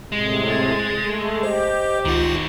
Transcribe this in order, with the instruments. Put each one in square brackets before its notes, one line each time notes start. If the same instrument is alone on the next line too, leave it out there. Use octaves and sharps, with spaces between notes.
[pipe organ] A2 C3 [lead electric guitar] G#3
[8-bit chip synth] G#6 A6
[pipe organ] A3
[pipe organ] G4 [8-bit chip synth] C5 D#5
[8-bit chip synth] C#2 F4 [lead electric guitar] D#3 F#4